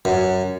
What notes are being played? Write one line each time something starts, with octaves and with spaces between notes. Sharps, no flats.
F#2